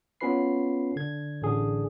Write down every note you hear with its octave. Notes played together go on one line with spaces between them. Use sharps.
B3 C#4 F4 B4 B5 C7
D3 G#6
A1 D3 G#4